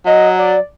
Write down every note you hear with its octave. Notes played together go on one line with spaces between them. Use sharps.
F#3 D#5
D5